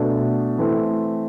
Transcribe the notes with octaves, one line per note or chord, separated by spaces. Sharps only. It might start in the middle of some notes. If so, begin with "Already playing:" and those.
Already playing: B2 A3 D4
E3 A3 C4